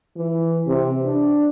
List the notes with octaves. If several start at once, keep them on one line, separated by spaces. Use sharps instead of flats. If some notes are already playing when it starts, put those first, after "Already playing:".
E3
C3
D4